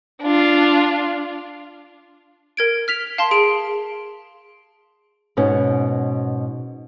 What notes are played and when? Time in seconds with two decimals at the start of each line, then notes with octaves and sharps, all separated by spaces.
0.22 D4 F4
2.57 A#4 G#6 D7
2.88 F6 B6 F7
3.18 F5 A5 C6
3.31 G#4 D7
5.37 G#2 B2 B3 C#4